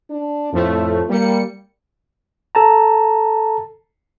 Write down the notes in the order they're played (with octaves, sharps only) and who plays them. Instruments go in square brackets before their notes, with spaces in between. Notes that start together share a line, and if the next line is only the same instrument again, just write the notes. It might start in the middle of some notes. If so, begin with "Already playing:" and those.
[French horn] D4
[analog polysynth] F2 F3 A3 [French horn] A2
[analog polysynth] G3 C#7 [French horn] A#3
[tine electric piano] A4 A5 A#5